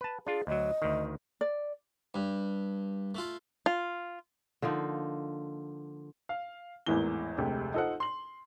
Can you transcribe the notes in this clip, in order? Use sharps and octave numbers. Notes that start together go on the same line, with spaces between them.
B4 A5
D4 F4 G#4
D2 F#3 D#5
D2 D#3
D5
G2
A3 F4
F4
D3 F3 A#3 D#4
F5
G#1 E2 A2 E3 A#3 G7
F1 D2 C3 G#3 G4
D#4 F4 A4 C5 F#5
C6 F#7